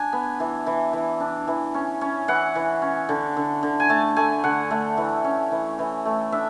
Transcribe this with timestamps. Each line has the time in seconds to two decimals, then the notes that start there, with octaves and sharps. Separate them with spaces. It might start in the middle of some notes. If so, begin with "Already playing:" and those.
Already playing: D4 G#5
0.13 B3
0.40 E3
0.66 E3
0.93 E3
1.20 D4
1.47 E3
1.74 C#4
2.01 C#4
2.28 E3 F#5
2.55 E3
2.82 C#4
3.09 D3
3.37 D3
3.63 D3
3.80 G#5
3.89 A3 A5
4.16 A3 G#5
4.44 D3 F#5
4.71 A3
4.97 E3
5.24 C#4
5.52 E3
5.79 E3
6.05 A3
6.32 D4 E5